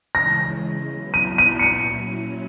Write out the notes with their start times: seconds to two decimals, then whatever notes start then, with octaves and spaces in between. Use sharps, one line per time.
0.15 C#3 E3 G#3 C#4 A#6
0.89 F#3 B3 E4
1.14 D#7
1.38 D#7
1.59 C#7
1.63 A#2 F#3 C#4 E4 D#7